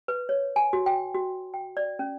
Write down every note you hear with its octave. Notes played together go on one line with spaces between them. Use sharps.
B4
C#5
G#5
F#4
G5
F#4
G5
D5
C#4